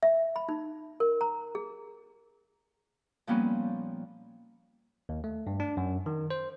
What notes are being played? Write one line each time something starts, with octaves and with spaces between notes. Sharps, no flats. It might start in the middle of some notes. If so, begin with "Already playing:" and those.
E5
B5
D#4
A#4
A#5
G#4
A#2 F3 G3 A#3 B3 C#4
D#2
A3
G2
D4
F#2
D#3
C5